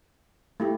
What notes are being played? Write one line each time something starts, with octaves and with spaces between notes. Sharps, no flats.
A3 E4 G4